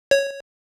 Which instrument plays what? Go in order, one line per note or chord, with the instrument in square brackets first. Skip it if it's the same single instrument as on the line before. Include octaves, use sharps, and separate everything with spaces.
[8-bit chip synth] C#5